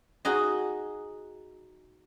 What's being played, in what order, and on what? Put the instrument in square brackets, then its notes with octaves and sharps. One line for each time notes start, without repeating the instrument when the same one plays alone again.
[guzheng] D#4 F#4 G#4 D#5